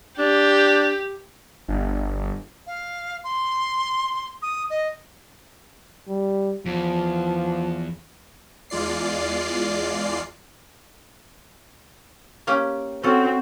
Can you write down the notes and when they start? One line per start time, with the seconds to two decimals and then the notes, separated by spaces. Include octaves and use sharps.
0.18 D4 G4
1.68 G1
2.67 F5
3.24 C6
4.42 D#6
4.70 D#5
6.08 G3
6.66 E2 F3
8.70 E2 G#3 F4 D5 C7
12.47 A#3 C#4 G4
13.03 C4 C#4 F#4 A4